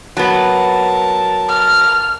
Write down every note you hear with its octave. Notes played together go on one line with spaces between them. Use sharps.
F#3 B3 A#4 A5
F6